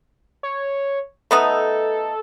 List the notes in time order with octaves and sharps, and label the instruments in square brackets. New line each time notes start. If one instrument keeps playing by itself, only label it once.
[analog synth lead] C#5
[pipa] A3 B3 D#4 [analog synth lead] A4